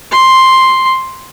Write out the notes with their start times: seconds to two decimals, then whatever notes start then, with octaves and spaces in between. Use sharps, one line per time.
0.12 C6